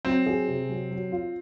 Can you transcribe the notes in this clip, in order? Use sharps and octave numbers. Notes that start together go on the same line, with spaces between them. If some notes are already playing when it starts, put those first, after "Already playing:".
F#3 C4
G#4
C3
F#3
F#3
F4